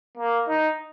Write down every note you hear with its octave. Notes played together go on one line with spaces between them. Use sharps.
A#3
D#4